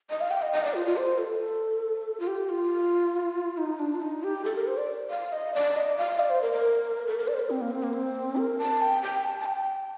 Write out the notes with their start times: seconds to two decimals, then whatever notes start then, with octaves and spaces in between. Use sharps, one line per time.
0.10 D#5
0.21 F5
0.31 G5
0.42 D#5
0.52 D#5
0.64 D5
0.74 F4
0.86 F4
0.97 C5
1.18 A4
2.20 F4
2.27 G4
2.49 F4
3.57 D#4
3.79 D4
3.95 F4
4.01 D#4
4.23 G4
4.45 A4
4.56 A#4
4.67 C5
4.78 D5
5.10 F5
5.33 D#5
5.55 D5
5.77 D#5
5.97 F5
6.19 D5
6.30 C5
6.42 A#4
6.53 A#4
7.07 A4
7.18 A#4
7.28 D5
7.34 C5
7.40 A#4
7.50 C4
7.61 A#3
7.72 C4
7.83 A#3
7.93 C4
8.37 A#4
8.59 A5
8.82 G5
9.03 G5
9.25 A5
9.40 A5
9.46 G5